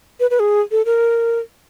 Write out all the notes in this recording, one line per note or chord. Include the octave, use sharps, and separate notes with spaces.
B4
B4
G#4
A4
A#4